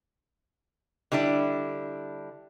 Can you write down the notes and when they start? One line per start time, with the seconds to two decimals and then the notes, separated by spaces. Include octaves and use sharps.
1.12 D3 G3 D4 E4